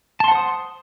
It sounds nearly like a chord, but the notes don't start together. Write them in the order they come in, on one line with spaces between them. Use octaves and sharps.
A5 C6 F#5 C5 D#6